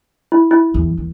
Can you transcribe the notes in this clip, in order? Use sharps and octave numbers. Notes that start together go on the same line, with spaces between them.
E4
E4
E2
D#2